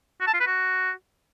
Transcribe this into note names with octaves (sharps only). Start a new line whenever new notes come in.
F#4
A5
F4
B4
F#4